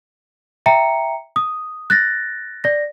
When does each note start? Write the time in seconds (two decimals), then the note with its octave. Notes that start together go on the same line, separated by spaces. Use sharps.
0.66 E5 G5 A#5 C#7
1.36 D#6
1.90 F#6 A6 A#6
2.64 D5 A#6